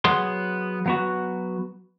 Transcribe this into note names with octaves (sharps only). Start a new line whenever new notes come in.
F#3 B3 G#4 C6
F#3 B3 F#4